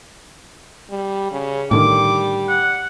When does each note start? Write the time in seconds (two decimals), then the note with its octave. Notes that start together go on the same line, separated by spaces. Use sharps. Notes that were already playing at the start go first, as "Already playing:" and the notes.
0.90 G3
1.32 C#3
1.71 A2 D3 D#3 G3 D6
2.49 F#5